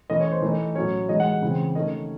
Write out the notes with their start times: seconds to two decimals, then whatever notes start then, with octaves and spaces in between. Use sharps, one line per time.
0.10 E3 A3 C#4 D#5
0.20 C#5
0.32 C5
0.42 E3 A3 D#4
0.75 A2 F#3 C#4 C#5
1.09 E3 G#3 D#4 D#5
1.20 F#5
1.42 C#3 E3 C4
1.75 D#3 A3 C#4 D#5